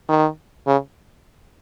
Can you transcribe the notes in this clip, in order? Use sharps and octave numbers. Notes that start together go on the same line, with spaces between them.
D#3
C#3